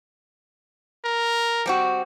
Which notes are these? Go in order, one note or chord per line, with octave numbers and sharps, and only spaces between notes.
A#4
G3 C4 F#4